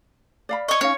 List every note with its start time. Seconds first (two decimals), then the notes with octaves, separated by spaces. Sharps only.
0.49 D5 F5 B5
0.68 C#5 D#5 C#6
0.81 C#4 D#4 C#5 F5